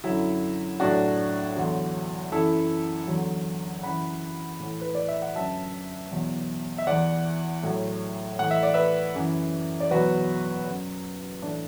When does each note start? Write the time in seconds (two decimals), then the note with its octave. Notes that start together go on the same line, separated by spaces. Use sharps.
0.04 F#2 D3 F#3 E4
0.80 A2 F#3 D4 F#4
1.56 E2 D3 F#3
2.31 F#2 E3 E4 A4
3.07 E2 D3 F#3
3.83 F#2 E3 F#5 B5
4.60 A2 E3
4.82 B4
4.95 D5
5.08 E5
5.22 F#5
5.35 F#2 D3 F#3 E5 A5
6.11 E2 B2 F#3
6.78 E5
6.87 E2 E3 D5 F#5
7.63 A2 F#3
8.39 A2 E3 F#5
8.51 E5
8.63 D5
8.74 B4 E5
9.15 F#2 E3
9.80 D5
9.91 E2 B2 F#3 F#4 B4
10.66 F#2 F#3
11.42 A2 E3 D4